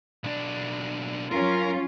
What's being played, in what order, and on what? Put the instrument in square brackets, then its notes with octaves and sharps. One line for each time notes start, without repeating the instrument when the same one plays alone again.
[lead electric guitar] B1 D4
[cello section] F#3 C#4 F4 [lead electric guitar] A#4